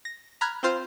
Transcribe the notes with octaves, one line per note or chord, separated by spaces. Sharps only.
A#6
A#5 B5 F6 F#6 G#6
C4 F4 C5 F5